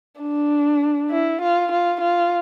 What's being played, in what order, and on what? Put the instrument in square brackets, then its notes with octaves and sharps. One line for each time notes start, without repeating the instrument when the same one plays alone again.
[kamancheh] D4
E4
F4
F4
F4